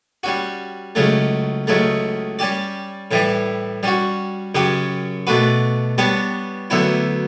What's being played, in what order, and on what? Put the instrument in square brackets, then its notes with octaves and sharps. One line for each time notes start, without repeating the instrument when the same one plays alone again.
[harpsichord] G3 C#4 F#4
C#2 C#3 F#3 A3
C#2 C#3 F#3 A3
G3 C#4 G4 D5
A2 E3 G3
G3 C#4 F#4
F#2 C#3 F#3 C#4 G4
B2 A3 D4 F#4 B4
G3 B3 D4 G4 C#5
D2 D3 F#3 B3 E4